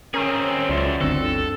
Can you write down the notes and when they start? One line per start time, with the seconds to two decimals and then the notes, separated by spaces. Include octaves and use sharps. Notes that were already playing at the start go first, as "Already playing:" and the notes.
0.14 C4 C#4 G#4 A#4 A#5
0.69 C#2 F#2 D5 E5 C6
1.01 G1 D2 D3 C4 A4